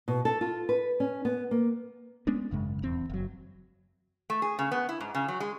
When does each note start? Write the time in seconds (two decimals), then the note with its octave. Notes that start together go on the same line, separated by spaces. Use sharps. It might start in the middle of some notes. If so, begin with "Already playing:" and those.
0.08 B2
0.25 A4
0.41 F4
0.69 B4
1.00 C#4
1.25 B3
1.51 A#3
2.27 G#3 B3 C#4 D4
2.51 G#1 F#2 C#3 G#3
2.82 D#1 E2 C4
3.10 F#1 F#3
4.30 A3
4.42 G#4
4.59 C#3
4.72 B3
4.89 E4
5.00 G#2
5.15 C#3
5.28 F#3
5.40 G#3